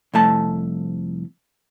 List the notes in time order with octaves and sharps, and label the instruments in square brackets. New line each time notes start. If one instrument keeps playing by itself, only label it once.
[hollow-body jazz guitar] C2 F2 A3 A5